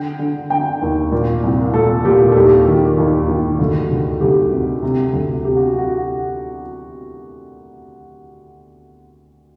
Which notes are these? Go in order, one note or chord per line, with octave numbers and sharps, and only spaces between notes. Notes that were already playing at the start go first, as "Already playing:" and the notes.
Already playing: D3 G5
D3
D3 G5
D#2
A#2
C2
A#2 A4
A#2 G4
A4
D#2 G4
D#3
D#2
D#3
D2
D2
D2 G4
C3
C3
D2
C3 G4
F#4
F#4